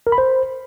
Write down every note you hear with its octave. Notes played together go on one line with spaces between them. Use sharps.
A#4
B5
C5